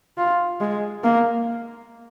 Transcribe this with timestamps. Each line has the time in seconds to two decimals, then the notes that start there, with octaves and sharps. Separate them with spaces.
0.18 F4
0.61 G#3
1.04 A#3